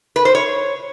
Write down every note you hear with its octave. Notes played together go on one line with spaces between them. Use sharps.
B4
C5
C#5